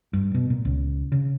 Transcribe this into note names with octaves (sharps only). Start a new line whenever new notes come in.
G2
B2
A#2
C#2
C#3